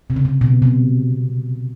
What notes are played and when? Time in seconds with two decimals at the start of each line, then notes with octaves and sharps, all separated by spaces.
0.10 C3
0.16 C#3
0.25 C3
0.41 B2
0.62 C3